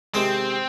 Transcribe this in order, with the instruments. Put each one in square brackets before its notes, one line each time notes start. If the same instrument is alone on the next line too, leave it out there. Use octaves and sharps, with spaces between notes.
[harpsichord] C3 D#3 G#3 [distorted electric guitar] C4